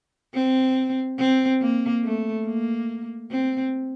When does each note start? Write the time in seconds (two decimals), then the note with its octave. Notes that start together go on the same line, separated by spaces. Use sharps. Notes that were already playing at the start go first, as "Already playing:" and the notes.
0.34 C4
1.19 C4
1.61 A#3
2.04 A3
2.46 A#3
3.31 C4